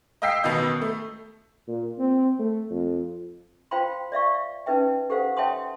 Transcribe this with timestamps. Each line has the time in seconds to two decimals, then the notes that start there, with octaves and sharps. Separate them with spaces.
0.22 D#5 F5 G5 E6 B6 C7
0.43 A1 B2 D#3 B3 D#5 G6
0.82 A3
1.67 A#2
1.98 C4
2.39 A3
2.70 F2
3.71 F4 C5 F5 G5 B5 C6
4.12 D5 E5 F5 C#6
4.66 C#4 D#4 B4 E5 G5
5.10 G4 A4 C5 F5 F#5
5.37 C#5 E5 G5 A5 C6 D#6